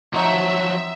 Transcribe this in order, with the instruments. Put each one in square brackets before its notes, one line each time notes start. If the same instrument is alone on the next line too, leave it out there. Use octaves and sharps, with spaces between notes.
[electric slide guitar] F3 F#3 C#5 [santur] C4 D#4 [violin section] E5